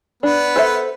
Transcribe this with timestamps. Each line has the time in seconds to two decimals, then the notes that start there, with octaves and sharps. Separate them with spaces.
0.23 B3 D4 B4
0.56 A4 C5 E5